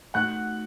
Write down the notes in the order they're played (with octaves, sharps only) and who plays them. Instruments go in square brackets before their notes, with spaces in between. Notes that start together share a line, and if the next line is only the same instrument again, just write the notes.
[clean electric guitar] A3 D#4 F#4 [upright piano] F#5 F#6